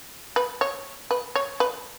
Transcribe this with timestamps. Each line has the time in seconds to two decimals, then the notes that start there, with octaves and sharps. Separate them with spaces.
0.36 B4
0.61 C#5
1.11 B4
1.36 C#5
1.60 B4